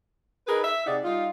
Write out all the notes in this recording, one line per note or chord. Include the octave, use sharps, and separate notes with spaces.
D#4 G#4 A#4 B4
E5
C3 D#4 G#4 D5 F#5
G3 D#4 F4